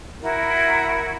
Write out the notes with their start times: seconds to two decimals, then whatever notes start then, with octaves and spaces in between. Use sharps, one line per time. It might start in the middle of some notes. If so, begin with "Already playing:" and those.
0.21 E4 F#4 A#4